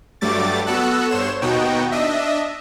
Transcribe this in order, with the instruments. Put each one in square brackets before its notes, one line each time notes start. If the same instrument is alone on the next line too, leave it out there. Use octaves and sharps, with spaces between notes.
[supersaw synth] G2 F#3 G3 A3 D6 A6
B3 F#4 A4 E6 F#6
G2 C5 C#5 E7
D#2 B2 B3 D#4 F#4 G5
D4 D#5 E5